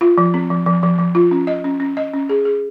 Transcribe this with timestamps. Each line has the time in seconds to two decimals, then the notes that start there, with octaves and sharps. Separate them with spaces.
0.01 F4
0.18 F3
0.34 C4
0.50 F3
0.66 F3
0.83 F3
0.99 F3
1.15 F4
1.31 C#4
1.47 D#5
1.64 C#4
1.80 C#4
1.97 D#5
2.13 C#4
2.29 G#4
2.45 G#4